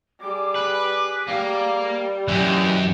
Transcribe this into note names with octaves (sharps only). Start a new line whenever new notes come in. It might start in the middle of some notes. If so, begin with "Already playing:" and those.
G3 G#4 D6
B4
G3 A#3
F#2 E3 G4 D#5